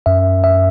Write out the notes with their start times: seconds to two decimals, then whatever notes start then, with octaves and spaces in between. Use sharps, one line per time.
0.06 F#2 E5
0.44 E5